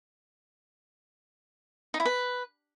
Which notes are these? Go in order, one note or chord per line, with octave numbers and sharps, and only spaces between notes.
D#4
E4
B4